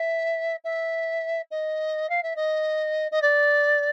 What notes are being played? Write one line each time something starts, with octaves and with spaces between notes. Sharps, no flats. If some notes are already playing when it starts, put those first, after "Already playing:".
Already playing: E5
E5
D#5
F5
E5
D#5
D#5
D5